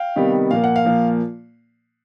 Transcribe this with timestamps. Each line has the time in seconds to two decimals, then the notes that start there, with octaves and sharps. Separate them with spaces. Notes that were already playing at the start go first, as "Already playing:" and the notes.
Already playing: F5 G5
0.16 C3 D#3 G3 B3
0.50 A#2 F3 A#3 F5
0.64 F#5
0.76 F5
0.85 A#2 F3 A#3